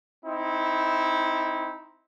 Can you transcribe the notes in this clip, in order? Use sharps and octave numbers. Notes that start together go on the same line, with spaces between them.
C4 D#4 E4